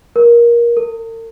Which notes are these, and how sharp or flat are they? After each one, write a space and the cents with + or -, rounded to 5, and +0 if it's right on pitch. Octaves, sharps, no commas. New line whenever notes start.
A#4 +20
A#4 -45